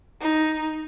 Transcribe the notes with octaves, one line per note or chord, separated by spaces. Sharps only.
D#4